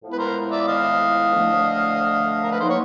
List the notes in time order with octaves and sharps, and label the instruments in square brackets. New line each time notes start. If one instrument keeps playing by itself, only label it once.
[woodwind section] A2 F3 G#3 B3 E4
[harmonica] B4
A#4 C5
D5 E5
D#5 F5
[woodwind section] D3 F3 A3
[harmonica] A#4
B4
[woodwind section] F#3 A#3 D#4 [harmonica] C5
[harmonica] C#5